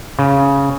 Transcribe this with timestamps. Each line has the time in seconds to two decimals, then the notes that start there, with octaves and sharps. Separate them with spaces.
0.19 C#3